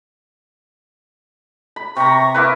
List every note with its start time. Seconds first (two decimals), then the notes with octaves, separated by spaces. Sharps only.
1.76 B5
1.97 C3 A#5 C#6
2.34 A#3 E4 B4